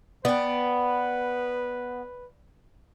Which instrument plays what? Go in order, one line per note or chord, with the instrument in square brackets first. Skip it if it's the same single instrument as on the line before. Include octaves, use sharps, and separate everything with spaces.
[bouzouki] B3 [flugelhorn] B4 [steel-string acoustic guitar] D5 G5